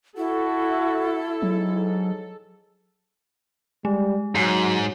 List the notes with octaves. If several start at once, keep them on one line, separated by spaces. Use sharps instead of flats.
E4 F#4 A4
G#2 F#3
G3 G#3
G#2 F#3